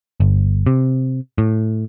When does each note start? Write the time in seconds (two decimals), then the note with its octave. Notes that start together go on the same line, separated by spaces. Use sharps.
0.20 G1
0.67 C3
1.38 A2